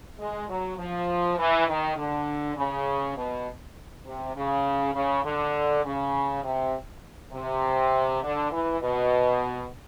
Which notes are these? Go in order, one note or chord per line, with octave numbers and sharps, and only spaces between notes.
G#3
F#3
F3
E3
D#3
D3
C#3
B2
C3
C#3
C#3
D3
C#3
C3
C3
D3
E3
B2